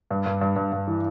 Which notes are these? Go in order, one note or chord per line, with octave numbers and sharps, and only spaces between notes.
G2
G2
G2
G2
G2
E3